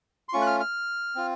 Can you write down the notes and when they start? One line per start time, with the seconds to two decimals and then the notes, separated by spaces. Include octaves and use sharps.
0.29 C6
0.33 A3 C#4 F4 C#6
0.42 F#6
0.47 F6
0.60 F6
1.15 C4 F4